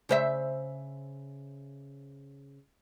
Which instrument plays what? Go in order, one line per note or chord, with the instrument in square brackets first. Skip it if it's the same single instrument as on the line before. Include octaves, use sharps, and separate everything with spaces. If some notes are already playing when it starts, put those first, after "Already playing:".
[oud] C#3 C5 E5